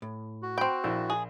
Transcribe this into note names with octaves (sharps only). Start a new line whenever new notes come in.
A2
F#4
C4 G5 B5
A#1 E4
G#4